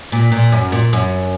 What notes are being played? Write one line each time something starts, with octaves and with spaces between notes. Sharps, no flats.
A#2
A#2
F#2
A#2
F#2